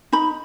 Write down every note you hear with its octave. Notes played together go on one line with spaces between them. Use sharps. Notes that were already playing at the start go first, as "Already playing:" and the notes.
D#4 B5